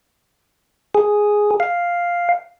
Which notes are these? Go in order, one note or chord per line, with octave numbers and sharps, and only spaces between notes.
G#4
F5